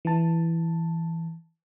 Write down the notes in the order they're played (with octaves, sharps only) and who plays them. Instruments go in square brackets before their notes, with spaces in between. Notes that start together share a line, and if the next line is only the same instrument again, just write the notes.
[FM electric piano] E3 A5